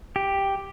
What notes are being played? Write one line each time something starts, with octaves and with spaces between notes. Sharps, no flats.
G4